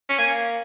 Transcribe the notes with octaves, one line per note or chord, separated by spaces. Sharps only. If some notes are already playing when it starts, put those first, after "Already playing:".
C#4
A#3 G#5